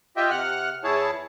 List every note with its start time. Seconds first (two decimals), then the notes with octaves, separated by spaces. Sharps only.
0.16 F4 G4 D#5 E5 G5
0.30 C3 F#5 F6 F#6
0.84 E2 E4 G#4 C#5 A5